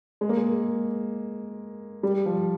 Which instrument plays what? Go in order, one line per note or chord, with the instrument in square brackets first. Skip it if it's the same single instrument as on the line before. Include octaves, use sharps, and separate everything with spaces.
[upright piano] G#3
A#3
G#3
G3
F3